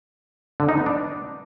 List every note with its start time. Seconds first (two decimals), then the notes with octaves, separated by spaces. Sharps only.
0.60 D3
0.69 D#4
0.77 B3
0.86 D4